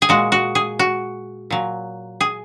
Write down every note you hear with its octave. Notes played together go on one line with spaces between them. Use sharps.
G#4
A#2 G#3 F#4
F#4
G#4
F#4
A#2 F#3
G#4